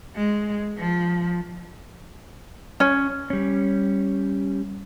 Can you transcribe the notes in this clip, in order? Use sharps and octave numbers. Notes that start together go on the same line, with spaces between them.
G#3
F3
C#4
G3 C#4